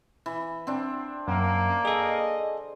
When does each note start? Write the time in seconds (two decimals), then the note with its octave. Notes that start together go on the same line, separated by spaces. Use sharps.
0.26 E3
0.67 C4 D4
1.28 F#2 A#3
1.85 G#4 A4 D#5